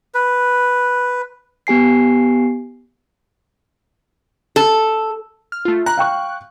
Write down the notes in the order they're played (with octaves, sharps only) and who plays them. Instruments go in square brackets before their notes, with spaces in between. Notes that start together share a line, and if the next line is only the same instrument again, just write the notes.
[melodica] B4
[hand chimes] B3 G4 G#5 C7
[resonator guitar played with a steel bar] A4
[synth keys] F6
A3 F4
[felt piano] A#5 [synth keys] F#6
[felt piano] F5 G5 C#6